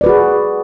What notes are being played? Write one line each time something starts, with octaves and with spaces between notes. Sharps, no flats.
F#4 G#4 B4 D5